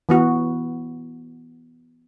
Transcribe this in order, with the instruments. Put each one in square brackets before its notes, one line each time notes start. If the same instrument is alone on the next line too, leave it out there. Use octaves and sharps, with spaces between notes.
[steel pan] E3 B3 F#4